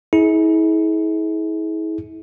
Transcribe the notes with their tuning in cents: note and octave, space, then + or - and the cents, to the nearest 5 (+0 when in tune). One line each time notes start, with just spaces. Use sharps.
E4 -40 G#4 +30